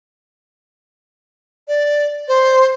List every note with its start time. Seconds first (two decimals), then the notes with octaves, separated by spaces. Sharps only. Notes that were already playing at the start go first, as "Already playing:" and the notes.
1.68 D5
2.28 C5